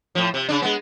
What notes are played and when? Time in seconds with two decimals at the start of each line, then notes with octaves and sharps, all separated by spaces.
0.15 A2 F3
0.34 C3
0.48 C#3 D4
0.62 G#3 B3